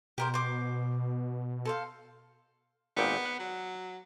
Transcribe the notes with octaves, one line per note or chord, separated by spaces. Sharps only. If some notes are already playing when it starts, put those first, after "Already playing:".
B2 G4 A#4 C5
C5 D6
A4 C5 F5
G#1 A#2 B3 G5
F#5
F#3